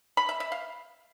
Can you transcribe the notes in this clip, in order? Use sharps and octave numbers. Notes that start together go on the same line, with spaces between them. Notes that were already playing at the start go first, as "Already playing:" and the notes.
B5
E5
E5
F5